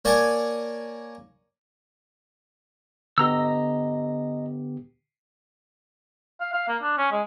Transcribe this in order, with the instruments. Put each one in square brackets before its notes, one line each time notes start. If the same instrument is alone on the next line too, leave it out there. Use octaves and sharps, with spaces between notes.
[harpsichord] A#3 C#5 D5 G#5 A5
[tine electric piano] D3 B3 G4 [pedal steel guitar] D#5 A#5 E6
[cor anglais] F5
F5
A#3
D4
C#4
G#3